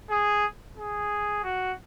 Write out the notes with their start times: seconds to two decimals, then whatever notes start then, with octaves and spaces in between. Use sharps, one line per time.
0.11 G#4
0.77 G#4
1.43 F#4